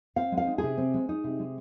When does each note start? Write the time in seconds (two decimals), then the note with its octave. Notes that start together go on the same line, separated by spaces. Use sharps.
0.16 C4 F5
0.32 G#3
0.37 F5
0.47 D#4
0.58 C3 G#4
0.78 C4
0.94 G#3
1.09 D#4
1.24 C3
1.39 G#3